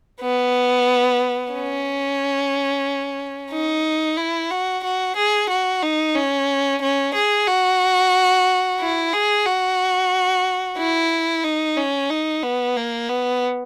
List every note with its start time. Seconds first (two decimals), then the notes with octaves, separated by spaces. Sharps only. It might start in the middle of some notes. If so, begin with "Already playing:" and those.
0.21 B3
1.53 C#4
3.52 D#4
4.18 E4
4.51 F#4
4.84 F#4
5.16 G#4
5.50 F#4
5.83 D#4
6.16 C#4
6.82 C#4
7.15 G#4
7.48 F#4
8.80 E4
9.13 G#4
9.46 F#4
10.78 E4
11.44 D#4
11.77 C#4
12.10 D#4
12.43 B3
12.76 A#3
13.10 B3